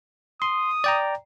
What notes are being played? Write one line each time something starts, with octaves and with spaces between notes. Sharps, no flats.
C6 D#6
D5 G5 A#5